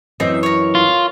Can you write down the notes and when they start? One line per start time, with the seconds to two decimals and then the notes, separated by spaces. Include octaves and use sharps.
0.20 F#2 E3 C4 D#4 D#5 E5
0.43 A#4 C#5
0.75 F4